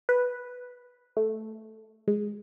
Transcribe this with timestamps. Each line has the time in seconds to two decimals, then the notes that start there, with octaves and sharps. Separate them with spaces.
0.09 B4
1.17 A3
2.08 G#3